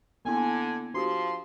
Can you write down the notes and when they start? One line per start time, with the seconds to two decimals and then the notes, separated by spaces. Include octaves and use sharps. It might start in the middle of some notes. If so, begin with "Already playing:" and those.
0.25 D3 A#3 B3 E4 G#5
0.94 F3 D4 F#4 G4 C6